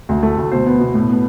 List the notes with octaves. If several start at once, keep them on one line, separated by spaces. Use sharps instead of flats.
D2
A3
D2
B2 C5
B3
B2
A2
B3